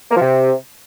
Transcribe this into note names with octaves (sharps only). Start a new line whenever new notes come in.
A#3
F3
C3